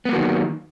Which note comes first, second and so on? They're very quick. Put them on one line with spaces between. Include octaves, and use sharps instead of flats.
B3 A#3 F#3 D#3